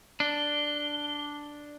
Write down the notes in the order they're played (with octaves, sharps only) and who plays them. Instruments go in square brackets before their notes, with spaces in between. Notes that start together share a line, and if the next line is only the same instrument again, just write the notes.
[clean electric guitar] D4 [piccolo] G7